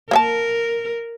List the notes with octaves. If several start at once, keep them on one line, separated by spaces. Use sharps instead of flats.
A#3 A#4 E5 A5